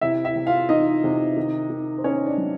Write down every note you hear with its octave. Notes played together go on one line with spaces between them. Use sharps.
C3 E4 E5
E4 E5
C3
F4 F5
E3 D#4 D#5
C3
D#3
D#3
C5
B3 C#4 C#5
D4 D5
F#3